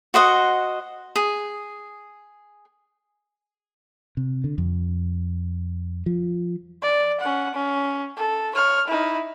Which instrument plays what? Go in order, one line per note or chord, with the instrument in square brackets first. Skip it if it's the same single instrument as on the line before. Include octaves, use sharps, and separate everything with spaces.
[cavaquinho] F#4 C5 D#5 F#5
G#4
[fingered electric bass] C3
D3
F2
F3
[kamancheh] D5
C#4 F#5
C#4
A4
C#5 F6
D#4 E4